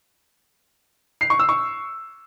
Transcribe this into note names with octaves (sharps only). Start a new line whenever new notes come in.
C7
C#6
E6
C#6